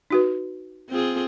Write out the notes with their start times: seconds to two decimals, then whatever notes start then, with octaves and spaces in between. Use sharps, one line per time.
0.11 D#4 F#4 B4
0.90 C4 F4 G#4